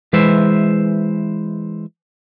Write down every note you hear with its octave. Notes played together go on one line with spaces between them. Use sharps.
E3 G#3 B4 C5 E5